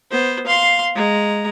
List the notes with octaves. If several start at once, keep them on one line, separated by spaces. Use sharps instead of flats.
B3 C5
F5 C6
G#3 A#5